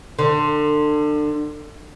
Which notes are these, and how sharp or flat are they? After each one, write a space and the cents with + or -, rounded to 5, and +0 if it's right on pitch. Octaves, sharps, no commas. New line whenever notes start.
D3 +30